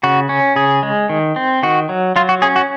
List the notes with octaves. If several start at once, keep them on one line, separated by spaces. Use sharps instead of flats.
C#3 F#4
C#4
C#3 G#4
G#3
D#3
C4
D#3 F#4
F#3
F#3 F4
F#4
C#4 G#4
F#4